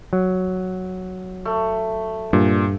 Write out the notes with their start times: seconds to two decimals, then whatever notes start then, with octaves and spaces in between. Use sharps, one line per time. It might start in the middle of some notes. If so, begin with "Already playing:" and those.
0.13 F#3
1.45 A3
2.33 G2 A#2